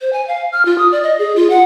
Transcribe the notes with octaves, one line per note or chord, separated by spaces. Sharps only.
C5
G#5
F5
F6
F4
D#6
D5
D#5
G#4
F4
F#5